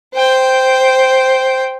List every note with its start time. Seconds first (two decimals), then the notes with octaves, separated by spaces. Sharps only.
0.14 C5 G5